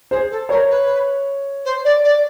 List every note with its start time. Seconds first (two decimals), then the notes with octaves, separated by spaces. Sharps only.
0.11 G#4 C5
0.31 A4
0.49 A#4 C#5
0.69 B4
1.65 C5
1.84 D5
2.04 D5